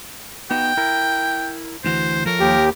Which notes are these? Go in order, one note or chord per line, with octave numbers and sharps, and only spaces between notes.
B3 D#4 F#4 G5
E4 A#4
D2 E3 F#4 C5
F3 A4 A#4 C#5
D#2 G4